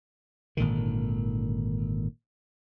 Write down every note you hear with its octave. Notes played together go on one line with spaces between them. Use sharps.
G#1 A#2 D3 D#3